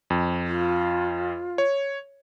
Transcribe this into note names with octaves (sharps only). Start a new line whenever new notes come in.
F2
F4
C#5